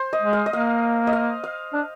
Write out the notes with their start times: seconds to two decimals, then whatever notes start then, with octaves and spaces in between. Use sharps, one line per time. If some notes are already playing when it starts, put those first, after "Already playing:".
Already playing: C5
0.13 D#5
0.22 G#3
0.33 F5
0.46 D#5
0.53 A#3 F5
1.07 D#5
1.13 F5
1.44 F5
1.73 D4